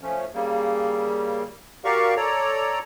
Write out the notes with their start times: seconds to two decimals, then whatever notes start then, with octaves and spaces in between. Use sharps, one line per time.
0.01 F3 A3 C#4
0.34 C#3 G3 A#3
1.85 F#4 G4 A#4 D5 F5 C#6
2.17 A4 C#5 D5 A#5